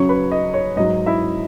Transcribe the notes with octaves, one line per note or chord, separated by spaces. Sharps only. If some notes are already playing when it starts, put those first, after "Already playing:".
Already playing: F#2 C#3 F#3 C#5 C#6
B4 B5
D#5
C#5
G#2 F#3 D#5
E4 E5